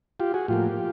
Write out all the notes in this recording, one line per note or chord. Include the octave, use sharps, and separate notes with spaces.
F4 G4
F#4 G#4
A2 F3 A#3 F4 G4